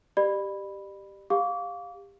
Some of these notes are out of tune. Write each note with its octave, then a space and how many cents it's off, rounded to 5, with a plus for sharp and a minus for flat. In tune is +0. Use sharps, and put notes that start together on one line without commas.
G4 +0 D5 +40 B5 +0
G4 +25 F5 +15 D6 -30